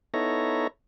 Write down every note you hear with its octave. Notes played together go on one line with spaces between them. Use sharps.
B3 D#4 E4 A4 C#5 A#5